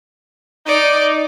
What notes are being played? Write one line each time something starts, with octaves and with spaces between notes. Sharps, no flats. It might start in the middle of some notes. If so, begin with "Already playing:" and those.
D#4 D5